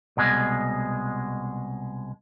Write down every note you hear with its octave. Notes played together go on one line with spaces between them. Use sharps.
C2 B2 G#3